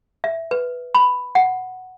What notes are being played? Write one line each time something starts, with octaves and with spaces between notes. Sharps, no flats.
E5
B4
B5
F#5